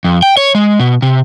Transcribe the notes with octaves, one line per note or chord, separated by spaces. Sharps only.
F2
G5
C#5
G#3
B2
C3